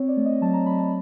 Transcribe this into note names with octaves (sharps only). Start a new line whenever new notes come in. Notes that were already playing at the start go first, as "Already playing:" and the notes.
Already playing: C4 C#5
D5
A3
D#5
F#3 A5
A#5
F#3 B5
A5